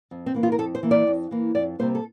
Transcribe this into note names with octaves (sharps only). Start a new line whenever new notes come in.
F2
C4
E3 A#3
F4
A#4
F2 A4
C5
E3 A#3
D5
F2
E3 A#3
F2 D5
C3 G3 A#3 C5
A4